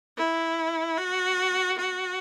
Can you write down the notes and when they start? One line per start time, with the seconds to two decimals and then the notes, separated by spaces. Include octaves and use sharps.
0.17 E4
0.97 F#4
1.78 F#4